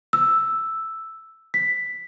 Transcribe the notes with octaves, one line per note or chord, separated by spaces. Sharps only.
E6
B6